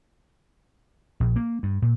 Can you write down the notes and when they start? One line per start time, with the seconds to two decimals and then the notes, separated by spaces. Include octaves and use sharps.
1.20 A#1
1.36 A#3
1.63 G2
1.82 A#2